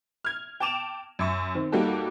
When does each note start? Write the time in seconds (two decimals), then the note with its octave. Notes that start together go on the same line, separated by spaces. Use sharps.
0.24 F6 G#6
0.60 G5 A5 D6 E7 F7
1.19 F#2 E5 C#6
1.55 D#3 C4
1.72 G3 A#3 D#4 F#4 G4 A4